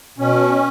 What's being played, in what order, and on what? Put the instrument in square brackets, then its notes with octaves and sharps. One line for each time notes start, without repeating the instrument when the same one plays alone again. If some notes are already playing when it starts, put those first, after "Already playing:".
[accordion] B2 C#4